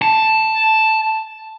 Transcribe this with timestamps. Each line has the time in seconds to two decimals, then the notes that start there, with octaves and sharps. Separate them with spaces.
0.02 A5